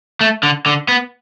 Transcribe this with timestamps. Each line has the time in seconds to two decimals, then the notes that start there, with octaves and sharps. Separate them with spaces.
0.21 A3
0.43 D3
0.66 D3
0.88 B3